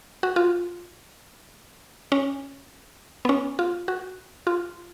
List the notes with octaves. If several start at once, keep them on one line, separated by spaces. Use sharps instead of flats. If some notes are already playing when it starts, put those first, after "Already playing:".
F#4
F4
C#4
B3
C#4
F4
F#4
F4